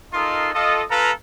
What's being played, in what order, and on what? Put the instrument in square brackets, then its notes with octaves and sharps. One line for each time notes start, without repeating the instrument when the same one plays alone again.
[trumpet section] D#4 F4 A4 A#4 D#5 C6
F4 A4 D#5
F4 A4 B4 F5 A#5